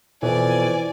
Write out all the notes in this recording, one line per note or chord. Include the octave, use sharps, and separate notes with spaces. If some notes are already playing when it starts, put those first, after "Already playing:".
F2 B2 E3 D5 G#5